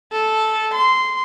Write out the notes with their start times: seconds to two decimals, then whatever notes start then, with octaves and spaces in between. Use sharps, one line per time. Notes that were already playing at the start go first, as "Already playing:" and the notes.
0.12 A4
0.73 C6